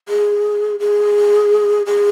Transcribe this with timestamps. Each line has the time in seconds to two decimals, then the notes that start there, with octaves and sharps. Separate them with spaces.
0.09 G#4
0.80 G#4
1.86 G#4